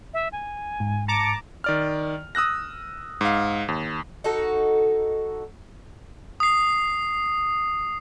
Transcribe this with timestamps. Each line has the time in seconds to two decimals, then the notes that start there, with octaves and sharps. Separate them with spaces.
0.14 E5
0.32 G#5
0.80 G#2
1.08 A5 A#5 D6 C#7
1.64 D#3 D5 F6
2.35 D#6 E6 F#6 A#6
3.21 G#2 F5
3.68 D#2
4.24 D#4 F#4 A4
6.40 D#6 C7